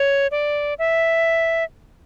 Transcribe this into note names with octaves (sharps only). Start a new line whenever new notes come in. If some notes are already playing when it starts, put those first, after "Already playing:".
Already playing: C#5
D5
E5